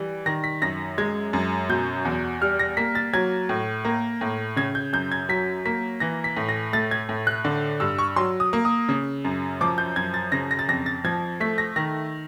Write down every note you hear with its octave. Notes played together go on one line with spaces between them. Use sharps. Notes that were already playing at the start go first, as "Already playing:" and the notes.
Already playing: E3 G3
D#3 A#6
B6
F#2 A#6
G#3 G#6
F#2
B2 G6
E2
G3 F6
A#6
A#3 B6
A6
F#3 G#6
A2
A#3
A2
C#3 G#6
G6
F#2 G6
G#6
F#3 B6
A#3 B6
E3 A#6
B6
A2
A#6
A3 A6
G#6
A2
F#6
D3
G2 E6
C#6
F#3 C6
D#6
A#3
D#6
C#3
F#2
F3 D6
G6
F#2 G#6
A6
C#3 A#6
A#6
A6
F2 A#6
A6
F3 G#6
A3 B6
A#6
D#3 A#6